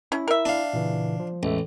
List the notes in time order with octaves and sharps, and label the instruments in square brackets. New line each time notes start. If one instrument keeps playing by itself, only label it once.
[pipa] C#4 [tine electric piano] E4
[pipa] A#4 E5
[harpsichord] D4 F5
[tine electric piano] A#2 C#3 E3
F3
[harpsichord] A1 [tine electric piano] E2 G#3 E5